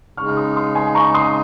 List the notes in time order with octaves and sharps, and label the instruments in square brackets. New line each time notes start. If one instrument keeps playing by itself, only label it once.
[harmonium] C#3 G#3 D#4 [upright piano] C#6 F6
[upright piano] F6
C6 D#6
C6 D#6
G#5 C6
A#5 C#6
C6 D#6